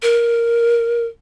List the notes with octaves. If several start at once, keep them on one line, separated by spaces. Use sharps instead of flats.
A#4